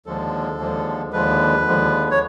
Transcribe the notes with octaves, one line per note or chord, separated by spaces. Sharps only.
D#2 D3 F3 G#3 A4
D#2 D3 F3 G#3
D#2 D3 F3 G#3 B4
D#2 D3 F3 G#3
C#5